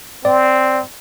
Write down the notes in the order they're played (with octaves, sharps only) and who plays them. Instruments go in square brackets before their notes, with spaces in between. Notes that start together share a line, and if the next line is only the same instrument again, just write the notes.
[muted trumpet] C4 [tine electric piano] D5